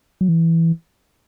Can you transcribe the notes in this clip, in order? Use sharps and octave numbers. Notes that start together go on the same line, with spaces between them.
F#3
E3